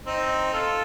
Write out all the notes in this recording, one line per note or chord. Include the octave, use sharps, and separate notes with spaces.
C4 D#4
F4 A4